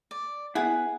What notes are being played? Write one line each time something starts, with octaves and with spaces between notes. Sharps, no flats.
D5
B3 E4 G#4 F#5